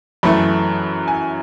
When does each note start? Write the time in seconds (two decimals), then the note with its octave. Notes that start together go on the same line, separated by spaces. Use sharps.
0.23 F#2 E3 A3 B5
1.08 G#5